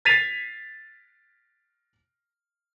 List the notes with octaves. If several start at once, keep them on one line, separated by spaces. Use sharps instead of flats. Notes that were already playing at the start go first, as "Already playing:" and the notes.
G#6 A6 B6 C7 D#7 F7